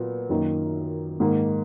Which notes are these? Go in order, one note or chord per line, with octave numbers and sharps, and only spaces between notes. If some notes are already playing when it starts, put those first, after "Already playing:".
Already playing: A#2 F#3 B3
F#2 D#3 A#3
G#2 D#3 A#3